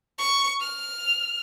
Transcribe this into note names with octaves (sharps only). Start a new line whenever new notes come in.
C#6
F6